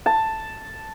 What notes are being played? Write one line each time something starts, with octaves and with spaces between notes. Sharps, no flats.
A5